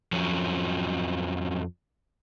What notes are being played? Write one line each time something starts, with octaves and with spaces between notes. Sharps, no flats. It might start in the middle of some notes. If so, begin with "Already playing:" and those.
F2 F3 F#3 C#4